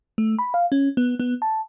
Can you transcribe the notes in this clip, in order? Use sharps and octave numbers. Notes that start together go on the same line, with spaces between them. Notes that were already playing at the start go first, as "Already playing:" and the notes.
A3
B5
F5
C#4
B3
B3
A5